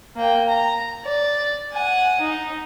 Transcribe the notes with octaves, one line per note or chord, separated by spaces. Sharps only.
A#3 G5
A#5
D5
F#5 G#5
D#4